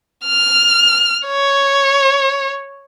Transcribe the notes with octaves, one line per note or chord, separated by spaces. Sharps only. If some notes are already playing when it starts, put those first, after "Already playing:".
F6
C#5